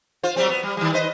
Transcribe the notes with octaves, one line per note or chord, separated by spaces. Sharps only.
F4 C5
F#3 G3 C4
B3
G3
D#3 G3
B4 C5 D#5